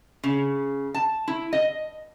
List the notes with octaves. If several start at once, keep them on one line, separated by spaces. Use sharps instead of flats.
C#3
A5
E4
D#5